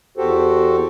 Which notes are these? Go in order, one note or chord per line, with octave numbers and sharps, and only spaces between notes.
E2 F#4 G4 A4 C5